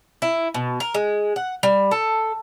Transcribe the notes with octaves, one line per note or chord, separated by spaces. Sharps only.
E4
B2
A#4
G#3
F#5
G3
A4